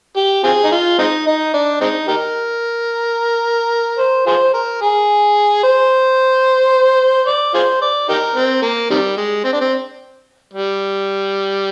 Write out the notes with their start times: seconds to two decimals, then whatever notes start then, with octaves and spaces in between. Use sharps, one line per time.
0.17 G4
0.44 C4 F4 G#4
0.64 D#4
0.71 F4
0.99 G#3 C4 D#4
1.27 D#4
1.54 D4
1.81 G#3 C4 D#4
2.08 D#4 G4 A#4
3.99 C5
4.27 F4 G#4 C5
4.54 A#4
4.81 G#4
5.63 C5
7.27 D5
7.54 F4 G#4 C5
7.82 D5
8.09 D#4 G4 A#4
8.36 C4
8.63 A#3
8.91 C3 D#3 G3
9.17 G#3
9.44 C4
9.53 D4
9.61 C4
10.54 G3